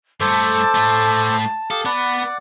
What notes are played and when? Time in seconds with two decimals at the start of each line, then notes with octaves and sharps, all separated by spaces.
0.20 G2 A3 A4 C5 A5 D6
0.75 A2 A3
1.71 G4 A4 F5 D#6
1.85 B3 B4 D5 F#5 D6